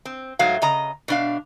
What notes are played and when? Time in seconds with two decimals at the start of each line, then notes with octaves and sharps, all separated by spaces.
0.05 C4
0.39 G#2 F#3 A3 F5
0.62 C#3 D#5 A#5
1.08 B2 D4 F5